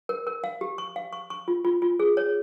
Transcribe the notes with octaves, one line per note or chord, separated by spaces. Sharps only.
A#4
A#4
F5
G4
C#6
F5
C#6
C#6
F4
F4
F4
G#4
C#5